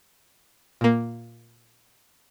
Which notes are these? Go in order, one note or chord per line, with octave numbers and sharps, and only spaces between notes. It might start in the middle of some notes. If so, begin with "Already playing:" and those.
A#2 A#3